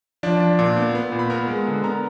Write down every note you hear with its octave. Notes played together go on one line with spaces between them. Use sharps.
F3 D4 D5
D4
A#2
B3
B3
A#2
B5
B3 A#4 A#5
G#3
D3
B3 A#4 A#5